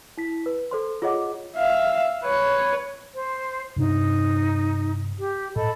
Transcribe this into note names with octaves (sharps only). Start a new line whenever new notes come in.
E4 B6
B4
A4 C5 C6
F4 G#4 C#5 D#5 F#5 D6
E5 F5
B4 C#5
C5
G2 C3 D4 D#4
G4
A2 A4 D#5 B5